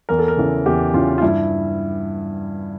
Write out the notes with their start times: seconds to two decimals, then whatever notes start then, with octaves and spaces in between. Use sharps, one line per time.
0.09 E2 A#4
0.19 A4
0.28 A#4
0.37 C#3 E3
0.66 E2 G4
0.94 C#3 E3 F4
1.18 F4
1.22 G2 E4